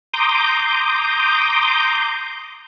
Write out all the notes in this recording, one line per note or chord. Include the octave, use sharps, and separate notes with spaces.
A#5 C6 D6 D#6 G6